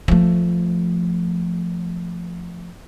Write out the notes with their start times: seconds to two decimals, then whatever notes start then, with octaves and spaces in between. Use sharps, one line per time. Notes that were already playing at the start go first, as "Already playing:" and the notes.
0.08 F3 A3